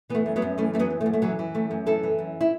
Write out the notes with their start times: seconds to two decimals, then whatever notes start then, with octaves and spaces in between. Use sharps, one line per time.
0.09 E3 B3
0.15 A3
0.26 F#2
0.36 F#3 B3
0.42 F#2
0.58 E3 A3 C#4
0.73 E3 A3
0.79 F#3 B3
0.90 F#2
1.01 A3
1.06 F#2
1.13 A3
1.22 E3 F#3
1.39 E3
1.54 F#2 A3
1.71 F#2
1.86 E3 E4 A4
2.03 E3
2.19 F#2
2.41 E4